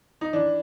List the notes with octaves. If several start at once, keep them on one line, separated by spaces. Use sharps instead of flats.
D#4
E3 D4